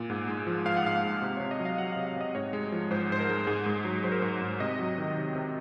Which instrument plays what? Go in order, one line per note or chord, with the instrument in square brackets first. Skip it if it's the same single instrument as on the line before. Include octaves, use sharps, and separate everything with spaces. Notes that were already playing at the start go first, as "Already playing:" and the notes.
Already playing: [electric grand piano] A#2
G#2
G#3
F3
G#2 F5
F#5
G#2 F5
G#3
C3
C3 C#5
D#5
F#3
F5
F#3 F#5
C3 F5
F5
C3 D#5
G#2 C#5
G#3
F3
G#2 C5
G#2 C5
A#4
G#3
G#2 G#4
G#2
F#3
F#3 C5
A#4
G#2 C5
G#2
C3 D#5
F#3
D#3
C3
C3